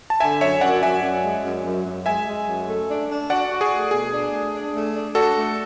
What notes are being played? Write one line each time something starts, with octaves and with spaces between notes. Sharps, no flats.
A5
D3 E5 G#5
F#2 C#5 E5
F#2 D5 F#5
F#2 E5 G#5
F#2
G#3
F#2
F#2
F#2
G#3 E5 G#5
G#3
F#2
A3
D4
D4
F#4 D5 F#5
F#4
G#4
A3
B2 G#4
D4
A3
D4
A3
D4
D4 F#4 A4
A3